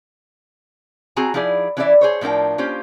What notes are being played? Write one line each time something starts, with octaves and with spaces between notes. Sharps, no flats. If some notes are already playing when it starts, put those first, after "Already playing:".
C4 F#4 G#4 G#5 A#5
F3 D#4 E4 G#4 D5
E3 C#4 F4 G4 D5 E5
G#4 C5 C#5
A2 F3 D4 A#4 G5
A#3 C#4 F4 G4 C5